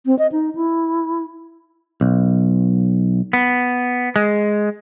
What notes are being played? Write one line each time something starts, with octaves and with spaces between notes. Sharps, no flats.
C4
D#5
D#4
E4
B1
B3
G#3